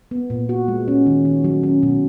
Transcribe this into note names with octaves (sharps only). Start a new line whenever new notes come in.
B3
A#2
F#4
G#3
C#4
D#3
D#3
F#3
C#4
B2